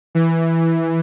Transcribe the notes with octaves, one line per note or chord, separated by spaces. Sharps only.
E3